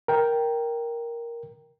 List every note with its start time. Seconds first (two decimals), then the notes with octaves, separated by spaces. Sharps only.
0.08 A#4 G5